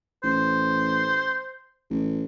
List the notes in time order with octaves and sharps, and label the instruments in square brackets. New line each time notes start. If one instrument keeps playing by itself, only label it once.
[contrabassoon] A1 [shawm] C5
[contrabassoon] A1